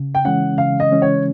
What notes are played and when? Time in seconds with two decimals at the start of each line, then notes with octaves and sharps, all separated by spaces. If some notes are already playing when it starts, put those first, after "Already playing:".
Already playing: C#3
0.15 G5
0.25 E3 G#3 C#4 F#5
0.58 C#3 F5
0.80 D#5
0.91 E3 G#3 C#4
1.02 C#5